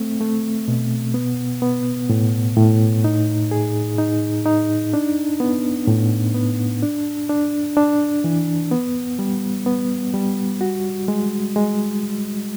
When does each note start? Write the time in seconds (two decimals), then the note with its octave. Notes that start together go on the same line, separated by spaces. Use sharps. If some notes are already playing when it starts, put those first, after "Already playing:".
Already playing: A3 C4
0.20 A3
0.68 B2
1.14 B3
1.62 B3
2.10 A2
2.57 A2
3.04 D#4
3.51 G#4
3.98 D#4
4.46 D#4
4.94 D4
5.40 B3
5.87 A2
6.35 B3
6.82 D4
7.29 D4
7.77 D4
8.24 E3
8.72 B3
9.19 G3
9.66 B3
10.14 G3
10.61 F#4
11.08 G#3
11.56 G#3